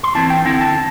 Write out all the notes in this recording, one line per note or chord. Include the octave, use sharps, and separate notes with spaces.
C6
E3 C4 E4 A5
G5
D3 C4 E4 G5
A5